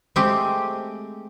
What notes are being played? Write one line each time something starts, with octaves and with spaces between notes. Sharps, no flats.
G#3 A3 C4 G4